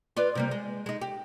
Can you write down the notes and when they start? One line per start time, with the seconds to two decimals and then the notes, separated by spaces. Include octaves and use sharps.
0.17 F4 B4 D5
0.35 C3 G3 A#3
0.51 G#3
0.86 G#3 D#4
1.01 G4